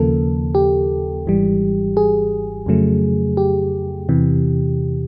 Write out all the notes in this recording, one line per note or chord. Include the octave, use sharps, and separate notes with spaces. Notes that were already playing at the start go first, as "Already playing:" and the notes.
Already playing: D#2 C#3 F3 A#3 A4
G4
G#1 G#2 E3 G3
G#4
F2 C#3 F#3 A3
G4
E2 C3 E3